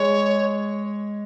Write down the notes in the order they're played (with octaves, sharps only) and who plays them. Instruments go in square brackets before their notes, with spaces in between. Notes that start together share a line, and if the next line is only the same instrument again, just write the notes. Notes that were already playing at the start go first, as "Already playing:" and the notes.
Already playing: [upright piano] G#3 [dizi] C#5